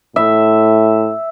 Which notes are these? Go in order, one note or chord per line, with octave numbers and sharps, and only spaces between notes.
A2 E5